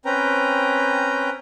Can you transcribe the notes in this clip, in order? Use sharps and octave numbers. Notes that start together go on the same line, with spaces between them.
C4 C#4 B4 G5 A#5